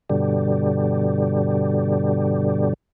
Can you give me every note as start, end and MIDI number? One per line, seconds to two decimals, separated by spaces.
0.09 2.73 43
0.09 2.73 47
0.09 2.73 50
0.09 2.73 55